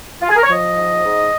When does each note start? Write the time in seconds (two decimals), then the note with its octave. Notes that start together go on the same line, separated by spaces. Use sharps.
0.22 F4
0.29 G#4
0.36 A#4
0.43 C#5
0.50 F3 D#5
0.77 G#2
1.05 G#2